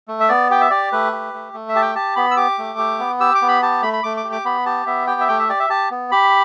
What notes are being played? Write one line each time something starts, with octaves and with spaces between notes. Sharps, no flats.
A3
E5
B3 D5
G4 G5
E5
G4 D5
A3 B4
G4
A3
A3
E5
G4 A5
G5
G4 A5
B3 B5
E6
G4 D6
A3
G4
B3
G4 E6
D6
B3
B5
G4 A5
A3 B5
B5
A3 D6
D6
G4
D6
B3 B5
G4 A5
B3 E5
G4 G5
E5
A3 G5
E5
G4 D5
E5
G4 A5
B3
G4 B5